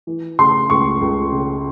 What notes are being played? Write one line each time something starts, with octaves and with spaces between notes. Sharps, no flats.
E3
C#3 C6
C#2 C#6
C#2
C#3